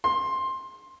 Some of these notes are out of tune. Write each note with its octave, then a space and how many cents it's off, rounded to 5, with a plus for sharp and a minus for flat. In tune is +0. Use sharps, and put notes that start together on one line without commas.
C6 +15